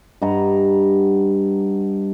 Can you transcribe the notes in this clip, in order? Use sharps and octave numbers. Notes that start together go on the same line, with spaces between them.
G2 D#5 F#5 A#5